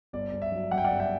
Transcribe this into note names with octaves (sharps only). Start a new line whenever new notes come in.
G1 D5
G1
E5
F#3
F#2 F#5
G5
D5 F#5
G1
E5 G5